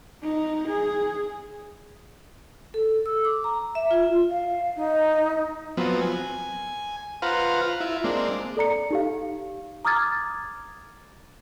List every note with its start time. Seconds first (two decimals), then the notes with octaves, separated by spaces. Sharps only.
0.23 D#4
0.68 G#4
2.74 A4
3.06 E6
3.25 D6
3.44 A#5
3.75 E5
3.91 F4
4.29 F5
4.76 D#4
5.77 F3 F#3 B3 C4
6.01 G#5
7.22 F4 B4 C5 F5 F#5 A#5
7.80 E4 F4
8.04 G#3 A#3 C4 D4
8.57 A4 D5 A#5 C#7
8.90 D#4 G4 F5
9.85 A#5 D6 D#6 F6 G#6 A6